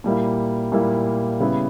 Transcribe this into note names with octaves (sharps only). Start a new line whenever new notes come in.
A#2 G3 A#3 E4
A#2 G3 A#3 E4
C#3 G3 B3 E4